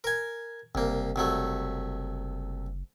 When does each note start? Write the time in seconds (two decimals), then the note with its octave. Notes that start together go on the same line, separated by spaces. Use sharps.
0.04 A#4 G#5
0.75 F#1 C2 A#3
1.16 C2 F#3 A3